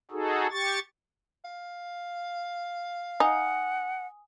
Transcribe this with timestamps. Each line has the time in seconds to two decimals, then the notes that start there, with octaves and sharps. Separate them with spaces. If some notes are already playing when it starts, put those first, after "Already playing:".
0.11 D#4 F#4 G#4 A4
0.51 G4 C#6 A6
1.45 F5
3.20 D#4 F#5 G#5 D#6